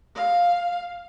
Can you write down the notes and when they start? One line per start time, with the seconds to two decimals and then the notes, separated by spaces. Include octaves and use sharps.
0.15 F5